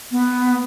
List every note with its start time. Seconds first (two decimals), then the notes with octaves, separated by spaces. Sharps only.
0.12 B3